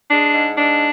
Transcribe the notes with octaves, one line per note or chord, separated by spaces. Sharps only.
G#3 D4
G#2
G#2 D4